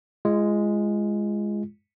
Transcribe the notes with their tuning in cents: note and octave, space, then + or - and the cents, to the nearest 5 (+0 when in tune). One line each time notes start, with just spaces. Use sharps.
G#3 +0 F4 -30